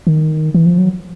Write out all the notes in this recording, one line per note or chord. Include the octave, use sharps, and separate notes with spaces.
D#3
E3
F3
F#3